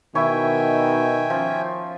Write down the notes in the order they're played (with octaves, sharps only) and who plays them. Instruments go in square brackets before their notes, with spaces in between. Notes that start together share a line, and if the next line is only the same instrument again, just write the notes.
[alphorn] B2 [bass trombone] D#3 [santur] E4 C#5 [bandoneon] E5 G5 G#5
[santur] F3 C#4